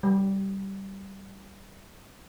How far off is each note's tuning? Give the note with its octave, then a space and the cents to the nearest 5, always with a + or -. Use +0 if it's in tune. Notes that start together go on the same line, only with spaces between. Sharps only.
G3 -10